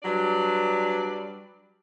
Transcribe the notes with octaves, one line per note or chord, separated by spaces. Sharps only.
F#3 G3 D4 B4 D5